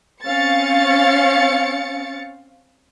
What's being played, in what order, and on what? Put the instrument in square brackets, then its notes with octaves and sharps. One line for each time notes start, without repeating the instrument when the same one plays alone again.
[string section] C4 C#4 F5 A6 C#7